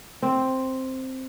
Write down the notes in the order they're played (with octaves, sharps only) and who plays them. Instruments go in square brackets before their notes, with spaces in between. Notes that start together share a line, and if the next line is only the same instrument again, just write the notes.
[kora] C4